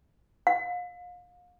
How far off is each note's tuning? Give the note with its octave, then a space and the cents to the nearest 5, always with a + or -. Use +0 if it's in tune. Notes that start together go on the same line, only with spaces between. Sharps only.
F5 +35